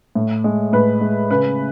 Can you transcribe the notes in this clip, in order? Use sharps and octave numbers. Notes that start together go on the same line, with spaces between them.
A2
G#3
A2 B4
G#3
C#3 B4